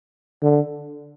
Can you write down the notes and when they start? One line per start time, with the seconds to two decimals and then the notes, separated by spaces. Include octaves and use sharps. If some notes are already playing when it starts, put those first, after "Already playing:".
0.42 D3